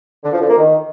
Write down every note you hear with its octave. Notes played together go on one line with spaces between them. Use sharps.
D3
F3
D3
A#3
D#3